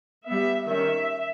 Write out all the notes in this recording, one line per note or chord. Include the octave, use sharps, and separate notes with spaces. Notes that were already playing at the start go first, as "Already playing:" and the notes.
G3 B3 E5
D#3 G3 C#4 E5